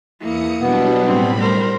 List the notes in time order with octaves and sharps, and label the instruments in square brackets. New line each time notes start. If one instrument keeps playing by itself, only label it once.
[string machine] E2 D#6 C#7 [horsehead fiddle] A#3 E4
[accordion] B2 B3 [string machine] F#3 G3 D4
[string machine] A2 G3 B5 [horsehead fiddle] C4
[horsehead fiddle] A#4 C5